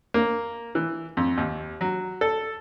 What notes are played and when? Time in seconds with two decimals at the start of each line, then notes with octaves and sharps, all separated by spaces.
0.14 A#3
0.75 E3
1.17 F2
1.38 D#2
1.81 F#3
2.21 A4